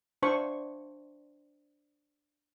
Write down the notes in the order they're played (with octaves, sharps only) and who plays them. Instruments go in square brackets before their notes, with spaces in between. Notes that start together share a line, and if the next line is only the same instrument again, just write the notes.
[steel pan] D4 C5 C#6